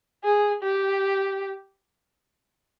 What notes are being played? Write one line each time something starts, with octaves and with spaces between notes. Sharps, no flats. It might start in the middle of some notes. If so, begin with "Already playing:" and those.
G#4
G4